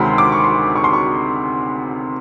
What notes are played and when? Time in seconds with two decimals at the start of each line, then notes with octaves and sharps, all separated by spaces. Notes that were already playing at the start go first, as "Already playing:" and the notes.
Already playing: D2 C3 D#3 G#3 B5 C6
0.18 D6
0.32 C#6
0.44 C6
0.76 C#6
0.84 C6
0.93 C#6